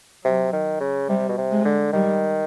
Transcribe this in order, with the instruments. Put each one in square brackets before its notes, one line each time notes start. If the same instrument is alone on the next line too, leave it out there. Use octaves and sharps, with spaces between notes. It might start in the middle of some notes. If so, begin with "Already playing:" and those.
[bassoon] C3 [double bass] F#3
[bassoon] D#3
C#3
[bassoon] C3 [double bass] G3
[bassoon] B2
C3
[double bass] G#3
[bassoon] D3
[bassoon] D#3 [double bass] G3